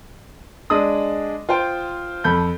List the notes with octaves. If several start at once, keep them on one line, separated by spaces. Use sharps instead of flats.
G#3 D4 D#6
F4 C5 G5
F2 A4 B5 G6